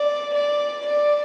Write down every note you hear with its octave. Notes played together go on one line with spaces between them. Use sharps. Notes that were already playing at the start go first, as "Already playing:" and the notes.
Already playing: D5
D5
D5